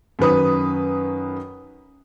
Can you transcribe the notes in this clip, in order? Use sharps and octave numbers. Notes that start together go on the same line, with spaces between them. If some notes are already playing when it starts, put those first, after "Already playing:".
F#2 D#3 B4 D#6